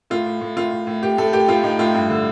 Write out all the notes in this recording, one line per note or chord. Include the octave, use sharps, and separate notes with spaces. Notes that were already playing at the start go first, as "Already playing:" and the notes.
A2 F4
A2
A2
A2 F4
A2
A2
A2 G4
A2 A4
A2 G4
A2 F4
A2 D#4
A2 F4
G2
D3